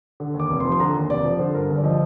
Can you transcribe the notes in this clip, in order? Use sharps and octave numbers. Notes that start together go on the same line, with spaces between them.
D3
D#2
D6
F1
C6
F3
C6
D3 A#5
D#2
F1 D5
F3
D3 C5
G2 A#4
G1
D5
F3 D#5